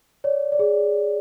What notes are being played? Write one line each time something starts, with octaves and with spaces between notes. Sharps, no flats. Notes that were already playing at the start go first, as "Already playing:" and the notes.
C#5 D5
D5
G#4